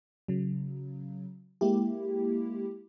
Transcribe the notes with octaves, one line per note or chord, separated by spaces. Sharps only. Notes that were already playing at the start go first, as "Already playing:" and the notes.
C#3 F#3
G#3 A#3 E4 G4